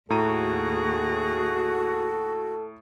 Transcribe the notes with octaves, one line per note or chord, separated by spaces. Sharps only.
D#2 A2 F#4 G#4 A4 A#5 D#7